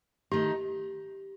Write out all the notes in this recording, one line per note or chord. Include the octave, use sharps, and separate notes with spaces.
D#3 A3 D#4 G4